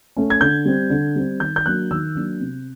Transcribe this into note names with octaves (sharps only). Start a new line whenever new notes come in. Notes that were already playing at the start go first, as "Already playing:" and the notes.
A3 C#4
G#6
D3 G6
G3 C4
D3
G3 C4
D#3 G6
G6
F#3 A#3 D4 F#6
D#3 E6
F#3 A#3 D4
C3